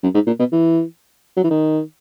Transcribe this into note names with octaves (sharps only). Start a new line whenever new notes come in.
F#2
G#2
A#2
B2
E3
F#3
E3
D#3